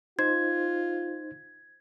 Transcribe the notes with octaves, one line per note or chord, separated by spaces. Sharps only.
D#4 F4 C5 G#6